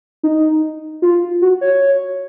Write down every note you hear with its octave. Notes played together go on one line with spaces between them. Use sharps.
D#4
F4
F#4
C#5